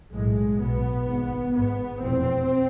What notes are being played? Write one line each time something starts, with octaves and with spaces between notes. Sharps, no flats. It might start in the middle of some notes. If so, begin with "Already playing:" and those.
B1 A2 G#3
B1 B2 B3
G#1 G#2
G#1 G#2 B3
F1 E2 B2 C4